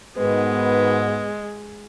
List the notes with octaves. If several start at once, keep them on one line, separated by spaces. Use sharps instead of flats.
G#2 B2 D#3 G#3 B3 B4